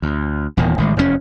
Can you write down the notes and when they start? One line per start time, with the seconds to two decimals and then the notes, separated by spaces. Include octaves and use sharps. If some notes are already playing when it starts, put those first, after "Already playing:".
0.02 D2
0.57 D#1 E2 A#2 D#3
0.78 A1 D#3 G#3
0.96 F1 E2 A2 C#4